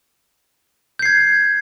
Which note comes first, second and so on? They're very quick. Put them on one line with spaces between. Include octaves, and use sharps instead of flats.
G6 C7 G#6